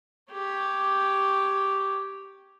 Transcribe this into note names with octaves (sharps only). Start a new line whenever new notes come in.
G4 C#5